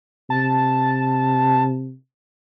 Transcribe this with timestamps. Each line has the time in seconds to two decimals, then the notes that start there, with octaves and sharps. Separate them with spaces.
0.30 C3 A5